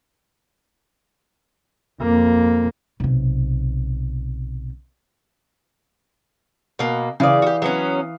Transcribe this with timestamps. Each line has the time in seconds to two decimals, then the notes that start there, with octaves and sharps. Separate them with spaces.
2.02 F2 A#3
3.00 B1 C3
6.79 B2 A#3
7.20 C#3 E3 D5 F5 D#6
7.42 F#4 G4
7.62 F#3 B3 C#4